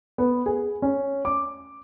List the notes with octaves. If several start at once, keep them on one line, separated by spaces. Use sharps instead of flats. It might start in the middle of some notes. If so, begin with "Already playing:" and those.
B3
G#4
C#4
D6